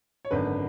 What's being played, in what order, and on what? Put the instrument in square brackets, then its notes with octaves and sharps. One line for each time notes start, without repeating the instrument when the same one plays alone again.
[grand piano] C#5
G#1 F#2 D3 B4